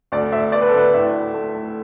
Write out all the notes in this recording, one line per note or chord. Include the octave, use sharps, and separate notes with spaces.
D2 D5
D2 E5
B3 D5
B4
A4
D2 B4
A2 E5
A2
A3
A3